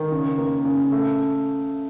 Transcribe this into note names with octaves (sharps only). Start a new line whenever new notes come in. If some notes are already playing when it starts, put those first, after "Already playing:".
Already playing: D#3
C#3
A#3
C#3
A3